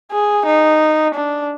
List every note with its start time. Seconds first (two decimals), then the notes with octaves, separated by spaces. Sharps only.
0.12 G#4
0.46 D#4
1.14 D4